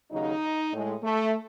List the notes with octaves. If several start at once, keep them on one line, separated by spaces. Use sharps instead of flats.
D#2 C#3 F#3 D#4
A2 G#3
A3